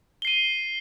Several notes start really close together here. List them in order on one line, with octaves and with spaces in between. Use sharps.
G7 C7 D#7